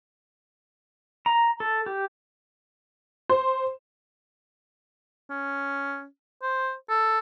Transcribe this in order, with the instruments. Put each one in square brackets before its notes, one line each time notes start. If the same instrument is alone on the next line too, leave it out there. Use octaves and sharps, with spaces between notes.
[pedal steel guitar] A#5
A4
G4
[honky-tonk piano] C5
[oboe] C#4
C5
A4